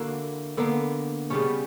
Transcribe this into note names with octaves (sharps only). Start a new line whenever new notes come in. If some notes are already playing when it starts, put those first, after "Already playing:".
Already playing: D3 A#3 E4 F#4
D3 A#3 B3
C#3 G3 B3 C#4